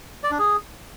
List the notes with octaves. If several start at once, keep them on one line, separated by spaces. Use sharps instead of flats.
D5
D4
G#4